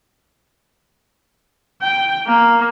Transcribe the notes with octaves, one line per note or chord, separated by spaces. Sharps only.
G5
A#3